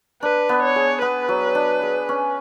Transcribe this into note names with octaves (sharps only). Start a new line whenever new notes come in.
D4 B4
B3
C#5
G#4
B3 B4
F#3
D4
G#4
C#4